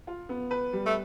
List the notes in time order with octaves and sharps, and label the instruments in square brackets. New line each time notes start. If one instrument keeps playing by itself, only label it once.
[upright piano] F4
B3
B4
G3
[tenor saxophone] A3